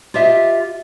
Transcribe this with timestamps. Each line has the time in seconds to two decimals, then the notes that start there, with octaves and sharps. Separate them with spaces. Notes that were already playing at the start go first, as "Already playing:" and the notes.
0.14 F4 G4 D#5 E5